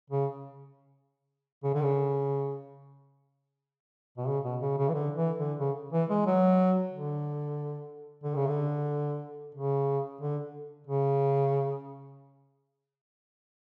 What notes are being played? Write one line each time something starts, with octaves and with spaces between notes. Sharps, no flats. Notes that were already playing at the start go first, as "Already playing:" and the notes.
C#3
C#3
D3
C#3
B2
C#3
B2
C#3
C#3
E3
D3
E3
D3
C#3
E3
G#3
F#3
D3
D3
C#3
D3
C#3
D3
C#3